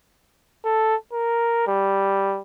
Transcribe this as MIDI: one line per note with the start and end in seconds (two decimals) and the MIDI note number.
0.65 0.95 69
1.13 1.63 70
1.67 2.42 55